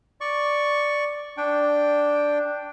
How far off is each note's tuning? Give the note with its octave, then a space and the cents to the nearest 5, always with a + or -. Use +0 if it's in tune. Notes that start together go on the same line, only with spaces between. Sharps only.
D5 +0 C#6 +0
D4 +0 G5 +0